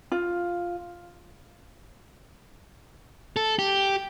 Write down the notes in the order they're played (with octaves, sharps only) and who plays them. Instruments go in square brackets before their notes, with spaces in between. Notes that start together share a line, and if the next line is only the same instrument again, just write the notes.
[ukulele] F4
[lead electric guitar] A4
G4